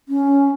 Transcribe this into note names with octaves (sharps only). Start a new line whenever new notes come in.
C#4